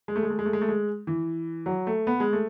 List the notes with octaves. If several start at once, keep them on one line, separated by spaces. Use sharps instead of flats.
G#3
A3
G#3
A3
G#3
A3
G#3
A3
G#3
E3
F#3
A3
B3
G#3
A3